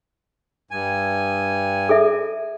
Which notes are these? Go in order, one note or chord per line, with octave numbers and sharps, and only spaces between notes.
G2 G#5
G#4 A4 E5